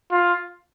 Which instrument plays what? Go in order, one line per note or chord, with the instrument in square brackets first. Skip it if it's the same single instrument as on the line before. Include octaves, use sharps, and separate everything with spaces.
[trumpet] F4